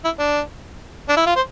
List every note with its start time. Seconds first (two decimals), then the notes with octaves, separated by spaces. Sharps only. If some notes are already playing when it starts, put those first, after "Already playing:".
0.05 E4
0.19 D4
1.09 D4
1.17 E4
1.26 F4
1.36 C5